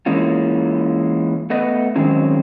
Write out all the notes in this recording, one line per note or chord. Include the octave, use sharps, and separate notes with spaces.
E3 G#3 A#3 C#4 F4
A3 B3 B4 D#5
D#3 F#3 G#3 C4 C#4